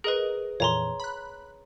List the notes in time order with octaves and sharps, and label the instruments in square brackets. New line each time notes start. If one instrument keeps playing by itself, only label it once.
[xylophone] G#4 B4 [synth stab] A#4 D#5
[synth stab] F2 A#2 E3 [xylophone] C#5 A#5 C6
[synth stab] B5 F#6